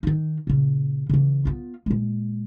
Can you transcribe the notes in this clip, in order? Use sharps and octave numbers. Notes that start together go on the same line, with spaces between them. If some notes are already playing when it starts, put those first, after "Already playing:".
D#3 D#4
A#2 C#3
C#3 E3
B3 F4
A#2 G#3